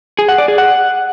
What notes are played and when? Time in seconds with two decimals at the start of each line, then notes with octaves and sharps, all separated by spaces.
0.19 G#4
0.28 F#5
0.38 D5
0.48 G#4
0.58 F#5